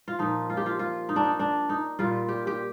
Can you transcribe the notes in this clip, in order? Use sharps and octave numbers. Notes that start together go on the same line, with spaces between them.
F4
A#2 F3 D#4
F4
G4
F4
F4
D#4
D4
D#4
D4
D#4
A#2 G3 F4
G4
G4